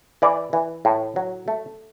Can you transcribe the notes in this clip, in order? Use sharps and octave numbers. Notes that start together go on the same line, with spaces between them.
E3 D5
E3
A2
F#3
A3